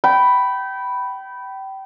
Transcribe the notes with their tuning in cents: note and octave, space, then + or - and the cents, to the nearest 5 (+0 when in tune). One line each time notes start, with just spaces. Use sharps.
G5 -25 B5 +0